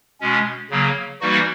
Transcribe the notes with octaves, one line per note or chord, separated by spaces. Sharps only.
B2 G#3 C#4
C#3 F#3 A#3
E3 G3 A#3 D#4 F#4